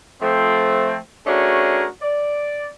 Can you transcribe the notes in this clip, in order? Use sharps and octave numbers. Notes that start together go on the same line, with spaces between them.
F3 A3 C4
A3 C#4 D4 F#4 G#4 A#4
D5